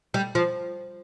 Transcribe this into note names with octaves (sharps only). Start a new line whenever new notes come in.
G3
F3